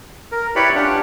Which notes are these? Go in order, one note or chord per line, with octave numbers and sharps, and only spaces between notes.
A#4
E4 G4 B4 C#5 D5 B5
C#4 D4 F4 G4 F#5